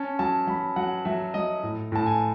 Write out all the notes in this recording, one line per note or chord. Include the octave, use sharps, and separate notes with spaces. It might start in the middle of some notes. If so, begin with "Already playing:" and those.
Already playing: C#4 A5
F#3 A5
F#3 B5
F#3 F#5
F#3 E5
F#3 D#5
A2
A2 A5
G#5